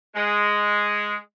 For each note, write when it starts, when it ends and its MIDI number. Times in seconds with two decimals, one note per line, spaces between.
0.16 1.15 56